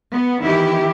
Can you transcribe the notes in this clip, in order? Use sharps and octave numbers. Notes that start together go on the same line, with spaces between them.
B3
D#3 E3 E4 G4